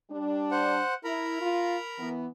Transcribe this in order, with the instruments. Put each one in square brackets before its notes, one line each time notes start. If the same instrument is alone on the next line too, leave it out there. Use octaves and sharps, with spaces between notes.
[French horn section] G3 D4
[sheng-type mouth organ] C5 F#5
[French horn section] E4 [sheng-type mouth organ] A#4 A#5 B5
[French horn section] F4
E3 B3